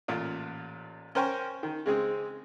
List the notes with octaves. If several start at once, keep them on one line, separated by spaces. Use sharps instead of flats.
A1 A#2 F4
C#4 A#4 C5 G5 G#5 C#6
D#3
C#3 G#3 C4 G#4